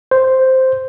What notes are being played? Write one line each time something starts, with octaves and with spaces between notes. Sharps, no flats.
C5